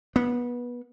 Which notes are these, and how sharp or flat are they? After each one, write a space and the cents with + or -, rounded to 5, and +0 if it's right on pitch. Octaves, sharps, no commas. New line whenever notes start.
B3 -20